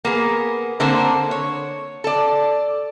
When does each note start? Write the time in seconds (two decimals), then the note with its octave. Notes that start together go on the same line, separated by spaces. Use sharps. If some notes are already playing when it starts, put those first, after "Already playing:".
0.05 A#3 B3 G#4
0.80 D3 A#3 C4 D4 A4 C5
1.31 C#5
2.04 A4 D5